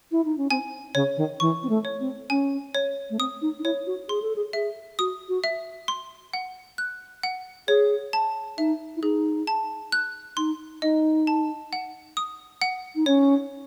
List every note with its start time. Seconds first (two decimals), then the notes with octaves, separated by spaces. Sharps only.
0.12 E4
0.25 D#4
0.37 C#4
0.50 C4 G#5
0.95 C#3 C#5
1.17 D#3
1.40 E3 C#6
1.63 C4
1.69 A3
1.85 C#5
2.00 C4
2.30 C#4 G#5
2.75 C#5
3.10 A3
3.19 C4 D#6
3.42 D#4
3.59 D#4
3.64 E4 C#5
3.87 F#4
4.09 G#4 C6
4.22 A4
4.36 G#4
4.53 G#4 E5
4.99 F#4 D#6
5.29 F#4
5.44 E5
5.88 C6
6.33 F#5
6.78 F#6
7.23 F#5
7.68 G#4 C#5
8.13 A5
8.58 D#4 E5
8.96 E4
9.02 D#4 G#4
9.47 A5
9.92 F#6
10.37 D#4 C6
10.82 D#4 D#5
11.27 A5
11.73 F#5
12.17 D#6
12.62 F#5
12.95 D#4
13.06 C#4 C#5